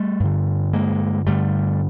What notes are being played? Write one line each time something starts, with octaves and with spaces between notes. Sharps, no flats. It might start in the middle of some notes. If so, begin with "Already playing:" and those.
Already playing: G3 A3
G2 D3
G#3 A#3
G2 D3 G3 A3